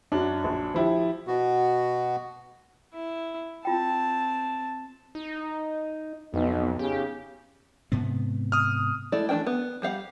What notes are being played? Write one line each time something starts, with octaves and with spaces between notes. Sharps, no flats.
F#2 D4 F#4
A#1
F3 E4 G4
B2 B3 F#4
E4
C4 F4 G5 A5
D#4
B1 F2 B3 D#4
C#3 G4
G#2 C3 B3
D#6 F6
G#3 A3 E4 A4 D5
E3 A3 D4 A#4 G5
B3
G3 G4 F5 F#5